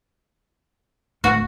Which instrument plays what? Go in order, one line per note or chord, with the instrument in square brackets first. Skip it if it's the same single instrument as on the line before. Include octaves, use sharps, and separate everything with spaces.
[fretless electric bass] D1 A3 [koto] F#4